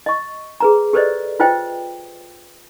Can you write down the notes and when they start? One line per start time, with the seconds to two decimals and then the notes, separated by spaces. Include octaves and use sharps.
0.06 D#5 C#6
0.60 G#4 B4 A#5
0.93 G4 A4 B4 C5 D5 D#5
1.40 F4 B4 C5 D#5 G5